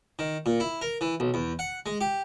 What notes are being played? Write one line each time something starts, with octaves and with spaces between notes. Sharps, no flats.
D#3
A#2
E4
A#4
E3
B1
E2
F#5
G#3
G4